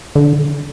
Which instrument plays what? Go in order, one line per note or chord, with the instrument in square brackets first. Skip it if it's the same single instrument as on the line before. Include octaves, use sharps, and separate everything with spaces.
[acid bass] D3